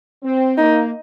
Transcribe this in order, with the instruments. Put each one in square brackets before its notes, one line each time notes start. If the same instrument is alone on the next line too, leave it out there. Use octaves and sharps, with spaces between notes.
[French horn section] C4
[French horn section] A#3 [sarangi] D#4